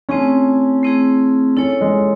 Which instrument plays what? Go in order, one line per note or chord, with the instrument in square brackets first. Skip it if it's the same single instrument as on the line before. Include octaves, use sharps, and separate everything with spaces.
[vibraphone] A3 C4 E4 G#4 [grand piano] C#4
[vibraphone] A3 C4 E4 G#4
[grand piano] C#4 [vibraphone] E4 A4 C#5
[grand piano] G#3